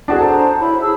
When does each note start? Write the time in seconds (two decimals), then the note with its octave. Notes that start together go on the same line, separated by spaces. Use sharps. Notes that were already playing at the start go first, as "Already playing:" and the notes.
0.08 D4 F#4 G#4
0.20 A4 C5 A5 A#5
0.60 E4 C#5 B5
0.81 G#4 A5 E6